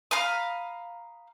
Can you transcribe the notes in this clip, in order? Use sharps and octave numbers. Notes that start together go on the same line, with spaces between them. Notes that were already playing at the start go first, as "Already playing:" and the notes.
F5 A#5 B5 D#6